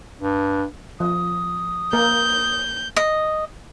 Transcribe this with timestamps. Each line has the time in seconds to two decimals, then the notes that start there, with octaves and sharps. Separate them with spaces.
0.21 G2
1.00 F3 D#6
1.93 A#3 A#4 G6
2.96 D#5